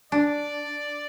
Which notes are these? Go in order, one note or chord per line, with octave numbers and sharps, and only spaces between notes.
D4 D5